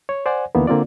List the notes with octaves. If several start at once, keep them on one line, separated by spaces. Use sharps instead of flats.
C#5
C5 D5 F#5 G#5
D#2 D3 E3 A#3 B3
D3 A#3 C4 F4 D5